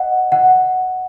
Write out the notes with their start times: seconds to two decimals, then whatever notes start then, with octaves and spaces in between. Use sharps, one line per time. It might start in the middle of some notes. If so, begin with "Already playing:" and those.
Already playing: D#5 F#5
0.32 F#5